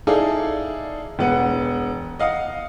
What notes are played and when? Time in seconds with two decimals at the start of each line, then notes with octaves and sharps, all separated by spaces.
0.07 D#4 E4 G#4 A4 D5 F5
1.19 E1 B3 F#5
2.19 D#5 F5 F#5 D#6